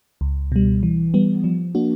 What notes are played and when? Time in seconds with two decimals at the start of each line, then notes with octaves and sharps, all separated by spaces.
0.21 C#2
0.52 B2 G3
0.83 E3
1.14 G3 B3
1.44 F3
1.75 A#3 D4 F#4